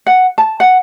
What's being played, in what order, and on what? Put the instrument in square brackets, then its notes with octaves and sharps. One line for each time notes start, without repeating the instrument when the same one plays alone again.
[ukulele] F#5
A5
F#5